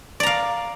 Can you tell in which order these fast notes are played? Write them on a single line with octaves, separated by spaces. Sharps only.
D5 A#5 F5